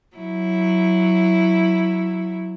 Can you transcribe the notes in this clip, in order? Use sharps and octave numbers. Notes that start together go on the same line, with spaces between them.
F#3 E4